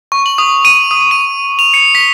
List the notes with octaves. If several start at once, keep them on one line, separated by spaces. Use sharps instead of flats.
C#6
F#7
D#6
D#7
D#6
D#7
F7
C#7
B6